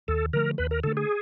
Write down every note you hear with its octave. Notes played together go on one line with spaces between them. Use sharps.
D#2 A4
D3 F3 A3 A#4
D#2 B4
A#4
D3 F3 A3 A4
G#4